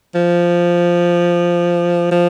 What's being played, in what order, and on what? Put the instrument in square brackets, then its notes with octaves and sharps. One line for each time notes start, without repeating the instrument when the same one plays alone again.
[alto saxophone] F3
F3